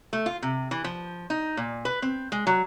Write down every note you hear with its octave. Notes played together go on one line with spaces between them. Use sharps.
A3
F4
C3
E3
F3
D#4
A#2
B4
C4
G#3
F#3